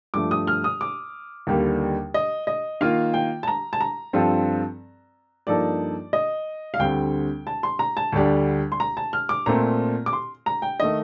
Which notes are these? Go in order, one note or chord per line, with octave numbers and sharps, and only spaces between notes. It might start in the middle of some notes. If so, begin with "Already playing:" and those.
G2 F3 A3 D6
D#6
F6
D#6
D6
D#2 D3 G3 A#3
D#5
D#5
D#3 A#3 F4 F5
G5
A5
A#5
A5
A#5
G2 F3 C4 F4 A4
G2 F3 A#3 D#4 A4 D5
D#5
F5
D2 D3 G3 C4 G5
A5
C6
A#5
A5
D2 D3 G3 D4
C6
A#5
A5
F6
D6
A#2 A3 C4 A#5
D6
C6
A#5
G5
D#3 A3 D#5